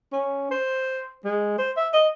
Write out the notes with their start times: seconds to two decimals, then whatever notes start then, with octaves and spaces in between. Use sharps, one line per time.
0.12 C#4
0.51 C5
1.24 G#3
1.58 C5
1.77 E5
1.93 D#5